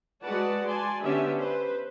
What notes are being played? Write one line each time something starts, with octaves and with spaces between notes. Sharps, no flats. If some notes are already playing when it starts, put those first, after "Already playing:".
G#3 F#4 B4 D5 F#5 A5
D5 G#5 A5 C6
D3 B3 C#4 D4 G4 E5
B4 C5